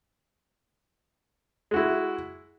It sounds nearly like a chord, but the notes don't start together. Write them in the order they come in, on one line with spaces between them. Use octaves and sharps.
G#3 F#4 E4